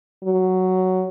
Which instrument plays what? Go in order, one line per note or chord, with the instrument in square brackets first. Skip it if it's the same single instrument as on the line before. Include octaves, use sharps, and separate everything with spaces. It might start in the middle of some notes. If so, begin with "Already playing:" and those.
[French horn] F#3